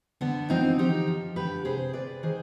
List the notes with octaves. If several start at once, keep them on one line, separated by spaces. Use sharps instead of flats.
D3 B3 D4
F3 C4 D#4
F3 D#4 G4
F3
D3 G4 B4
C3 G#4 C5
C3 B4 D5
D#3 G#4 C5